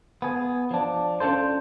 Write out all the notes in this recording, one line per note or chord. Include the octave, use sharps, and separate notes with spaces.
B3 G#4
F3 D4
C#4 D4 F4 A4 C5